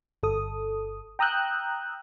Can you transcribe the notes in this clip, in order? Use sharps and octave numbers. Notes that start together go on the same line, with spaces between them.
G1 A4 D#6
G5 A#5 D#6 E6 F#6 G6